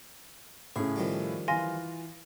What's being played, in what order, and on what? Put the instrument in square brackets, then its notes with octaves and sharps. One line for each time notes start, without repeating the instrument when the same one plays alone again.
[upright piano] A2 C#3 [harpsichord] G#4
[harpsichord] D#3 F3 G3
[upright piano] E3 F4 [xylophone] G#5 C6 A#6